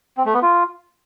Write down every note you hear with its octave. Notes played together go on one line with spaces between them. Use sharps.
C4
A3
B3
F4